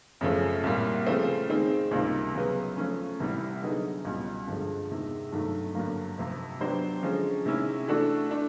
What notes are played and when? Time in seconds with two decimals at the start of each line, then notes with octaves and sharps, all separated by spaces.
0.21 F#2 C#3 F3 A3
0.64 C2 A#2 G3 A#3
1.07 C#3 F3 A3 C4
1.49 D#3 G#3 C4
1.91 C#2 C3 D#3 G3 A#3
2.34 C#3 F#3 B3
2.77 F3 A3 C#4
3.20 C2 C3 E3 G3
3.62 D3 F#3 B3 D#4 G#4
4.05 C#2 B2 G3
4.47 G2 D3 F3 G#3
4.89 E2 C3 D#3 G#3
5.32 G2 D#3 F#3 A3
5.75 G2 D3 F#3 A#3
6.18 F2 C3 F3
6.60 F#3 B3 D4 G4 C5
7.03 D3 F3 G#3 C#4
7.46 C3 D#3 G#3 C#4 E4
7.88 E3 A3 D4 F#4 A4
8.31 A3 D4